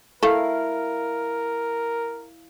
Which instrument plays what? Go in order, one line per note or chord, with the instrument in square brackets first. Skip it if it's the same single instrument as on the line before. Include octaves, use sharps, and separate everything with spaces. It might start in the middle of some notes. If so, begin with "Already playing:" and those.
[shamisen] A3 [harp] E4 F5 [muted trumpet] A#4